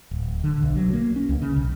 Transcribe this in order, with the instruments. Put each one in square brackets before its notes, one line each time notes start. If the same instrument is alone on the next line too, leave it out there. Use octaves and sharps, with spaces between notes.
[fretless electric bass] D1
D3
B1
F#3
A#3
C#4
C#2
C#3
B1